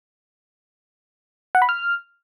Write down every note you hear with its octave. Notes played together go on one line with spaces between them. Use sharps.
F#5
B5
F6